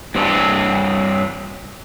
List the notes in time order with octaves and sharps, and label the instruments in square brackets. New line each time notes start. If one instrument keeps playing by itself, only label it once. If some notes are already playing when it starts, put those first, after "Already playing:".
[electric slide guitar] G2 C4 D4